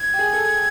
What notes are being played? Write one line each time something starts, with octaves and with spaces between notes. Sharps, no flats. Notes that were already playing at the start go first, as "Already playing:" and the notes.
Already playing: G#6
G4
G#4
A4